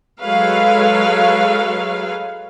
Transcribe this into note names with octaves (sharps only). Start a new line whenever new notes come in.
F#3 G#3 A4 B4 C#5 F5